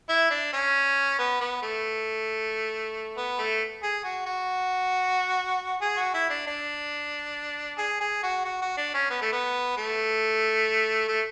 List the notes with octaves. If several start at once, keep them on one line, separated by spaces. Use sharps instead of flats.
E4
D4
C#4
B3
B3
A3
B3
A3
G#4
F#4
F#4
G#4
F#4
E4
D4
D4
G#4
G#4
F#4
F#4
F#4
D4
C#4
B3
A3
B3
A3
A3